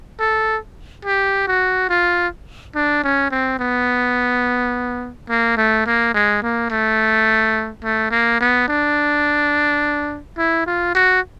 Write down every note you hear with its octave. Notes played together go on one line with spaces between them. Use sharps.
A4
G4
F#4
F4
D4
C#4
C4
B3
A#3
A3
A#3
G#3
A#3
A3
A3
A#3
B3
D4
E4
F4
F#4